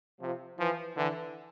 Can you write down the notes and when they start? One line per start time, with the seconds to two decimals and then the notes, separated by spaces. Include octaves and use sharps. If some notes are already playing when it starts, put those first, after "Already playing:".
0.20 C3 F3
0.58 E3 F3
0.96 D3 E3